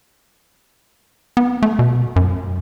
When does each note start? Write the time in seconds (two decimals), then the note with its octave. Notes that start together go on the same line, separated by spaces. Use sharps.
1.37 B3
1.63 A3
1.79 B2
2.16 F#2